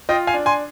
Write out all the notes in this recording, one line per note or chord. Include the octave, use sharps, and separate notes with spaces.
F4 D#5 G5
F5 G#5
D4
G#5 C6